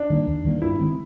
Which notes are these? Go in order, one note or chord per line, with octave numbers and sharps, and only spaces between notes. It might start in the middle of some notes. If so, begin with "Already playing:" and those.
Already playing: D4
D#3 G3 A#3
D#2
D#3 G3 A#3
G2 E4
D#3 G#3 C4